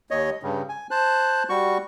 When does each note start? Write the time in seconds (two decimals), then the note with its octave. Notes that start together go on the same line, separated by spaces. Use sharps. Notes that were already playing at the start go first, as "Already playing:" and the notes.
0.11 D#2 C#5 D#5
0.43 G2 C#3
0.69 G#5
0.91 C5 A5 F#6
1.49 G3 F#4 C#6